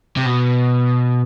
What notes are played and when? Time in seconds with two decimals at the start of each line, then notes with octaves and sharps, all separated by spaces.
0.17 C3
0.26 B2